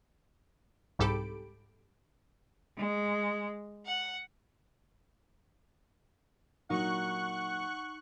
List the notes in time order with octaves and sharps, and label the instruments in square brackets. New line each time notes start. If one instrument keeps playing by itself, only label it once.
[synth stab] C2 G#2 G4 A4 B5 D7
[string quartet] G#3
F#5
[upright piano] A#2 F#3 [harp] D#4 [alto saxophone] F#5 [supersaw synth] C#6 F#6